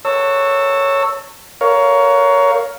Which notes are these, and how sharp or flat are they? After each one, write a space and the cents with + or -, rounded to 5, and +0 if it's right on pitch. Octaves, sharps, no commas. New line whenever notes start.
C#5 +0 A5 +45 E6 +0
A#4 +5 C#5 +20 F5 +0